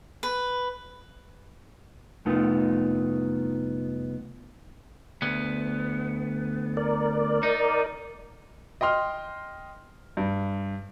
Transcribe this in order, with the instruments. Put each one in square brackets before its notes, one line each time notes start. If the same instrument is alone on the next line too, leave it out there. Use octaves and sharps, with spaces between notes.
[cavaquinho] B4
[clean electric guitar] C2 F2 A3 B3 D#4 F4
[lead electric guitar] D2 B3
[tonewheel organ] A#4 D5
[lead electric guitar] D#4
[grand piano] D#5 G5 C6 F6
G2